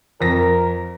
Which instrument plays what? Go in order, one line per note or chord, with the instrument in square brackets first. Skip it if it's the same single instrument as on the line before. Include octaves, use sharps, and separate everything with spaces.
[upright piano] F2 A#6 [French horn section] A#4